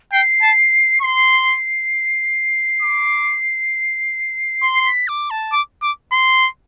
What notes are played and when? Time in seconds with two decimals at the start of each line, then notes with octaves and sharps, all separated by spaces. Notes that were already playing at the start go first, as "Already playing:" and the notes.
0.12 G5 C7
0.42 A5
1.02 C6 C7
2.82 D6
4.62 C6
4.86 B6
5.08 D6
5.30 A5
5.53 D6
5.83 D6
6.12 C6